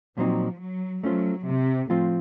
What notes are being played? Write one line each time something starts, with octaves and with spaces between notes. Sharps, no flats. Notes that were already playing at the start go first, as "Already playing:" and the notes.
A#2 F3 F#3 C4 D#4
F#3
F#3 A3 C#4 F4 C5
C3
A2 F3 C4 F4 C5